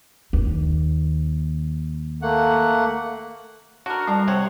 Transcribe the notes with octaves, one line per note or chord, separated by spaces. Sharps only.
D#2
A3 A#3 F#5
D3 F#4 A#4
E3 G3 A4 A#5
C3 C5 C#5 F#5